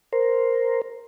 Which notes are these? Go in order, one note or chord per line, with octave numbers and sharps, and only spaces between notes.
A#4 C5